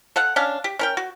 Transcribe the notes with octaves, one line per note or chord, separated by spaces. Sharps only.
A4 F5 F#5
C#4 D4 F5
G4
C#4 A#4 G5
F#4